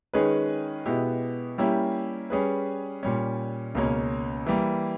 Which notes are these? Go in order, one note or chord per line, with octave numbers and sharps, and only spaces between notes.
D#3 G#3 C#4 G#4 B4
B2 G#3 B3 E4 G4
G3 A#3 C#4 E4 G4
G3 C#4 G#4 B4
A#2 G3 C#4
C#2 B2 A#3 C#4
E3 G3 A#3